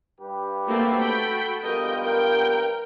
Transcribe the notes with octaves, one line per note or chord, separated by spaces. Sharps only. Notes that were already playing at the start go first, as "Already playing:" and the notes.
G2 G4 B4
A3 A#3 C4 F#4 A4
G5 B5
G2 F3 B3 A#4 D#5 G5
A#4 G5